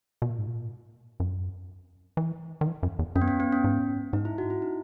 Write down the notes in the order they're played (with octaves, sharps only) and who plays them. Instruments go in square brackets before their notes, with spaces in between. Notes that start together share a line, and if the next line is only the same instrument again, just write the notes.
[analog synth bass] B2
A#2
G#2
A#2
F#2
E3
D#3
E3
F#2
E2
[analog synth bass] F#2 [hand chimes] C#4
[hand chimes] B3
C#4
B3
C#4
[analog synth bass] G#2
[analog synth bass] G#2 [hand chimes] D#4
[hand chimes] E4
F#4
E4
D#4